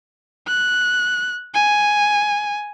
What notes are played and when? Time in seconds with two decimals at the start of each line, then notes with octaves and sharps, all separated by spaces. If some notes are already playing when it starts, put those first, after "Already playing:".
0.48 F#6
1.55 G#5